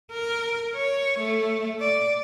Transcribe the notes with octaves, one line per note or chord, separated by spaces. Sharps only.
A#4
C#5
A3
D5